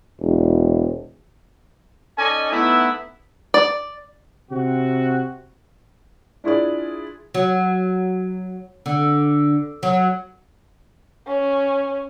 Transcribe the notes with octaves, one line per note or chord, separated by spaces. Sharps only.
E1
C#4 D#4 A4 D5 D#5 G#5
A3 B3 D#4 E4
D5
C3 C4 F#4
D4 E4 F4 G#4 D5
F#3
D3
F#3
C#4